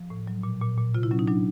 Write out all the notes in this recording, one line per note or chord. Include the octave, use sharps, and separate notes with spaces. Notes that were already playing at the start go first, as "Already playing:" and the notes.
Already playing: F3
A2
F#3
A#2
A#2
A#2
C3 F4
E4
F#3 C#4
D#4
F#3 D4